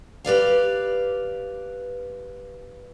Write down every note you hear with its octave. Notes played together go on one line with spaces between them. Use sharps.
G4 B4 D5 F5